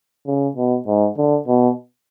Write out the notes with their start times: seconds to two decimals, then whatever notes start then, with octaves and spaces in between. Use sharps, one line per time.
0.27 C#3
0.57 B2
0.87 G#2
1.17 D3
1.48 B2